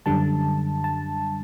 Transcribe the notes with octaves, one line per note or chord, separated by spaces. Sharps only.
F#2 D3 G3 A5
A5